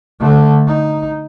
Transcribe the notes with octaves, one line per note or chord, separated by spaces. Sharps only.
D3 A3
D#4